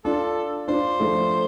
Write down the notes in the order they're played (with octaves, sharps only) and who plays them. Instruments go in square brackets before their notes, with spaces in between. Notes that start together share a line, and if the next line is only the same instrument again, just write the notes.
[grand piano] D4 F4 [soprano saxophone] A4
[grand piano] D4 F4 [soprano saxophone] C5
[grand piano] F3 A3